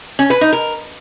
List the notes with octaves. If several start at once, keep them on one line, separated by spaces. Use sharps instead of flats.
C#4
B4
D#4
A#4